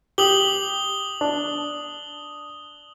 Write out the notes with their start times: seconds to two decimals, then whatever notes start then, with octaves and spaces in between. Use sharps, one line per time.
0.18 G4 D#6 F#7 G7
1.21 D4